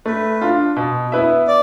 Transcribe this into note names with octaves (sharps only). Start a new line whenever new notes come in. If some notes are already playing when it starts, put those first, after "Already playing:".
A3 B4
D4 F4
B2
B3 E4 B4 E5
D5